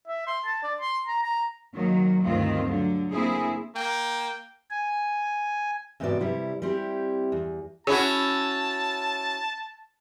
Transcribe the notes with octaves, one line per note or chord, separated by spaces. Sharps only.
E5
C6
A5
D5
C6
A#5
A#5
D#3 F#3 A#3
D2 G2 D#3 C4 F4
D3 F#3
A#3 C4 E4 G#4
A#3 G5
G#5
E2 G#2 C3 B3 F#4 D5
C3 G3 E4
G3 C4 E4 G4
E2
C#4 E4 F#4 G#4 A5